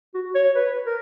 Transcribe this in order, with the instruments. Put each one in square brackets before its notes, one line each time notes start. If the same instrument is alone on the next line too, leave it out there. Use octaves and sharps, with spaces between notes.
[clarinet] F#4
C#5
B4
A#4